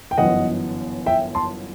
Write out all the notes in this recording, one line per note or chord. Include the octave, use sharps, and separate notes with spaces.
G5
G1 F#2 E3 B3 D#5 F#5
E5 G5
A5 C6